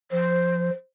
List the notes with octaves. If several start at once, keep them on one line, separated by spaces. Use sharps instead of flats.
F3 C5